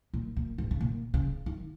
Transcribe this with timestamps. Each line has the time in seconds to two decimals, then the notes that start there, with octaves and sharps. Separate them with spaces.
0.14 A#2
0.36 A#2
0.58 G#2
0.71 C#3
0.81 A#2
1.14 C#3
1.46 D#3